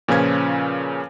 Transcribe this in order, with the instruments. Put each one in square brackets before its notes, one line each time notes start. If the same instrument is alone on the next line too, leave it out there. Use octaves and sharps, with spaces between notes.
[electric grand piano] A#2 C#3 F3 C#4 B4 G#6